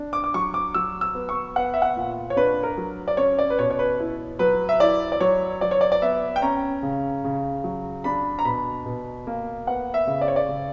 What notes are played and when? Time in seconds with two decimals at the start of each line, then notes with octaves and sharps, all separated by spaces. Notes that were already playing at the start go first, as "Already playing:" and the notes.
Already playing: D4
0.13 D6
0.24 D6
0.34 F#3 C#6
0.54 D6
0.74 F#3 E6
1.01 E6
1.15 B3
1.29 C#6
1.56 B3 F#5
1.74 E5
1.82 F#5
1.96 A#2
2.30 C#5
2.37 D4 B4
2.63 A#4
2.77 F#3
3.08 D5
3.17 C#4 C#5
3.39 D5
3.50 B4
3.59 B2 C#5
3.70 C#5
3.79 B4
4.00 E4
4.39 F#3 B4
4.69 E5
4.80 E4 D5
5.12 D5
5.20 F#3 C#5
5.61 F#3 D5
5.71 C#5
5.81 D5
5.92 D5
6.02 B3 E5
6.36 G5
6.42 C#4 A#5
6.83 C#3
7.24 C#3
7.64 F#3
8.04 D4 B5
8.39 A#5
8.45 B2 B5
8.86 B2
9.27 A#3
9.67 B3 F#5
9.94 E5
10.07 C#3
10.21 D5
10.28 C#5
10.36 D5
10.49 C#3